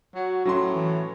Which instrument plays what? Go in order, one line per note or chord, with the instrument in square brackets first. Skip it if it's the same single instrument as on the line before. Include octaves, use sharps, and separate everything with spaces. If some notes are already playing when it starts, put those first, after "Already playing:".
[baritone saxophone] F#3 [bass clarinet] F#4
[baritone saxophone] A2 [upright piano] F#3 C#4 C6
[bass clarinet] E3